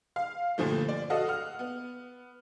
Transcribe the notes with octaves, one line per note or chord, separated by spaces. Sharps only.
F5
G2 A#2 D3 F3 A3
D5
F#4 A4 D#5 F5 F#5
F#5 F6
B3